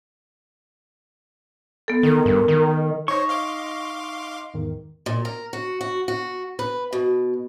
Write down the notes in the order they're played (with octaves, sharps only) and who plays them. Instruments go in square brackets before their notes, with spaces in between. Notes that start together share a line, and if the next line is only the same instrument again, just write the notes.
[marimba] B3 A4
[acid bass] D#3 [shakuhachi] A#4
[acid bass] G2
D#3
[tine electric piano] D#4 [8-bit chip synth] C5 C#5 [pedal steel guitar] D#5 C#6
[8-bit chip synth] F5 C6 D6
[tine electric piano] E2 G#2 D#3
[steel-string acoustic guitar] A#2
A#4
F#4
F#4
F#4
B4
B2